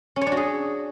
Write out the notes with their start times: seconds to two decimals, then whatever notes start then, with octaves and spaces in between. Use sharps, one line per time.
0.16 C#4
0.21 C#5
0.27 D4
0.32 F#4
0.37 G#4